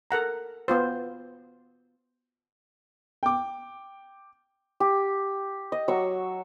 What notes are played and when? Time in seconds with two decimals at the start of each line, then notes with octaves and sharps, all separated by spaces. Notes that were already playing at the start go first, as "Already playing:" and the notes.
0.11 A4 A#4 F#5 A#5
0.68 B3 F4 C5
3.23 G5 D6
4.80 G4
5.72 D#5
5.88 F#3 C#6 E6